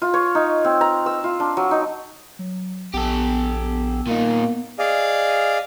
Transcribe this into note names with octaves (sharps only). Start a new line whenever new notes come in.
F4
C#5
D#4
C4
A#5
E6
F4
D4
F#3
D#4
F#3
A#1 B3 G4 A4
A#2 A#3 D#4
G#4 D5 D#5 F5